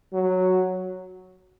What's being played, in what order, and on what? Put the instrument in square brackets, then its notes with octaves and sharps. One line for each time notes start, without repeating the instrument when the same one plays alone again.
[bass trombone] F#3